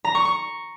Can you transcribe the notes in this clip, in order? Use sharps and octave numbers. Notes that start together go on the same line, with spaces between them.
A#5
C#6
C#6